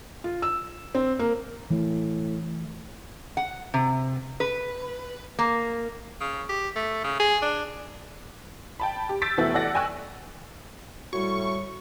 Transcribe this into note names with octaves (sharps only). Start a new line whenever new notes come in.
F4
E6
C4
A#3
A2 E3
F#5
C3
B4
A#3
C#3
G4
A3
C#3
G#4
D4
G5 A5 B5
G4
E6 G6 A6 B6 D7
F1 E3 B3 F#4 A4 E5
E3 A4 D5 F#5 A#6
G5 G#5 C#6 E6 F#6
A2 G3 F#4 C#6